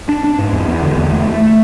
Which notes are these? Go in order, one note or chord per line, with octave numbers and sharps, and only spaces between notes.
D4
D4
G#2
E2
E2
D3
E2
A3
A3
A3